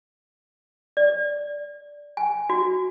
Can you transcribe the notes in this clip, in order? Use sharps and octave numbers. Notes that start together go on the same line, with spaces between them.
D5
G#5
F#4